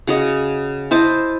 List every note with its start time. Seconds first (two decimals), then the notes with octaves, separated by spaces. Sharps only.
0.07 C#3 F#4 C#5 D#5
0.91 E4 C5 D#5 A5